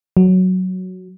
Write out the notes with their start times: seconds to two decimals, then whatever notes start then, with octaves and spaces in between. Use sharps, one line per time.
0.17 F#3